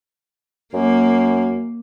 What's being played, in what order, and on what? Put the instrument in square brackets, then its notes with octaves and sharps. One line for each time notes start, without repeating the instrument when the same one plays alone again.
[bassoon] F#2 [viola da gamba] A#3